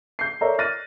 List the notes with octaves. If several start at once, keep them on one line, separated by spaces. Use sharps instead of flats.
G6 C7
A4 A#4 C#5 D5 E5 A#5
F6 F#6 A6 A#6 D#7